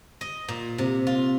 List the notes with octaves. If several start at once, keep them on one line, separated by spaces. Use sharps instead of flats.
D#5
A#2
C3
F4